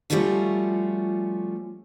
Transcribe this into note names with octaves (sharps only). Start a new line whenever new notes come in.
F3 G3 A3 C#4 F4 F#4